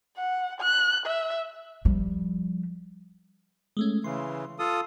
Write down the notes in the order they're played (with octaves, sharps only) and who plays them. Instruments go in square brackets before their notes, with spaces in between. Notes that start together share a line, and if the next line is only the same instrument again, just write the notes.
[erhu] F#5
F#6
E5
[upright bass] F3 G3
[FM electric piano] G#3 A3 C#4
[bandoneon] C#3 E3 [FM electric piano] C6
[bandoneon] F4 A4 D#6